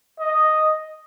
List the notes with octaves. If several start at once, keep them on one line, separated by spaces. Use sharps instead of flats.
D#5